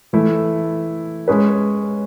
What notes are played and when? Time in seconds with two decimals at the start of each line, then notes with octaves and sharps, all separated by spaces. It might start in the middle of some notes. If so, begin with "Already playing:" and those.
0.13 E3 A3 E4 A4
1.28 G#3 C#4 G#4 B4